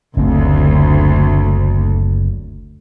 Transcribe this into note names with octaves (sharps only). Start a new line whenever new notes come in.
F#1 D2 C4